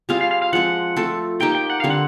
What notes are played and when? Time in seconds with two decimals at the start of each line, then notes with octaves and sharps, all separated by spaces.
0.09 G3 C4 F4 G#4 F5
0.21 F5
0.31 F5
0.42 F5
0.53 F3 G#3 C4 F#5
0.96 A3 C4 F4 A4
1.40 A#3 D#4 G4 A#4 G5
1.55 G5
1.70 F#5
1.80 D3 G3 C4 F5
1.90 F#5